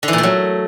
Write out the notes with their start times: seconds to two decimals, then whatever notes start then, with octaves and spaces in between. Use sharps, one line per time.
0.03 D3
0.08 E3
0.13 A#2
0.18 A3
0.23 F#3